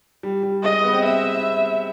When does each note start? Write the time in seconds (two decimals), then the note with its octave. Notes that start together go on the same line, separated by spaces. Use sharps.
0.23 G3
0.43 G3
0.63 G#3 D#5
0.84 B3
0.93 C4
1.02 B3 E5